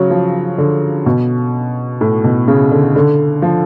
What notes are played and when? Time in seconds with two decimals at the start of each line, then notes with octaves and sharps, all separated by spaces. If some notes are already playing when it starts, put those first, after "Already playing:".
Already playing: C#3 F#3
0.10 F3
0.58 D3
1.06 B2
2.01 A2
2.24 B2
2.48 C#3
2.71 D3
2.96 D3
3.42 F3